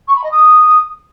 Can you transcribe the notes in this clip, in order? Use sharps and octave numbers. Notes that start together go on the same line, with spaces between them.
C#6
B5
D#5
D#6